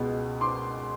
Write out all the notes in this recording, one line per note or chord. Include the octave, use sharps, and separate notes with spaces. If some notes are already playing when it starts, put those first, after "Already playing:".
Already playing: C#2 B2 G#3 B3
C6 D6